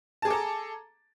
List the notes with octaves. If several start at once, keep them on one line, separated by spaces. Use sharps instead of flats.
G#4 A4 A5 A#5 D6